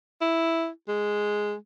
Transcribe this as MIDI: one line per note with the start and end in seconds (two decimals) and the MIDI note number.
0.21 0.68 64
0.88 1.55 56